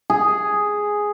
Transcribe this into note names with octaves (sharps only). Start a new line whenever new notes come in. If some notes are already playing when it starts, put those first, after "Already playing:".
G#4